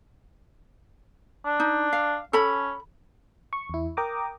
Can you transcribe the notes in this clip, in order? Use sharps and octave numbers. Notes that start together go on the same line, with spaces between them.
D4
D#4
F5
C#4 A4 B5
C#6
E2 E4
A#4 G5 A#5 D6 D#6